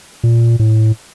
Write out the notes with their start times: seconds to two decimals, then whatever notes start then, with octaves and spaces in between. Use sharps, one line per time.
0.24 A#2
0.59 A2